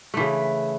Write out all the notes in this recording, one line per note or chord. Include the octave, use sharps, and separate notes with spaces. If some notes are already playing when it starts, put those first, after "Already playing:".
C#3 E3 A3